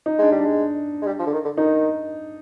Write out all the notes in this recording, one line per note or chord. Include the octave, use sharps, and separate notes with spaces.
D#4
G#3 D4
G3
D4
G#3
G#3
G3
F3
D3
D#3
D3
D#3 D#4